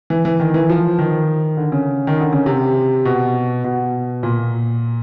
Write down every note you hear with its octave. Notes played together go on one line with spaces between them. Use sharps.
E3
E3
D#3
E3
F3
D#3
D3
C#3
D#3
D3
C#3
C3
B2
B2
A#2